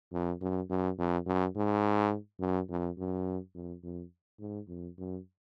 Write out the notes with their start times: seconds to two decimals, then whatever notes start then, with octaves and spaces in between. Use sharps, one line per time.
0.13 F2
0.41 F#2
0.70 F#2
0.98 F2
1.26 F#2
1.56 G#2
2.40 F#2
2.69 F2
2.98 F#2
3.55 F2
3.83 F2
4.40 G#2
4.68 F2
4.98 F#2